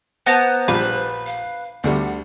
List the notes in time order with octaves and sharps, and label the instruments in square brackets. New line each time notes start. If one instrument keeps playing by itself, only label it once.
[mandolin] B3 A#5 [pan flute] C5
[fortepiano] A#1 G3 F4 [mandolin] B4
[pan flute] F5
[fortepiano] D2 D3 G3 [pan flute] F#5